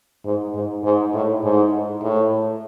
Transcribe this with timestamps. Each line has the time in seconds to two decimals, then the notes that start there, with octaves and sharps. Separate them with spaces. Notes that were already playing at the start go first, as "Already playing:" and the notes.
0.25 G#2
0.54 G#2
0.84 G#2
1.14 A2
1.43 G#2
2.02 A2